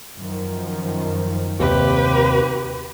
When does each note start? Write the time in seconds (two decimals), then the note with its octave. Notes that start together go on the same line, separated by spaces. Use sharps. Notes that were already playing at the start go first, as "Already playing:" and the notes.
0.17 F#2 D#3 F3
1.60 D#2 C3 G4 B4